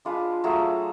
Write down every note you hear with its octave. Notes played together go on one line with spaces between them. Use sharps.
G#3 D4 F4 B4
F#3 A3 F4 G#4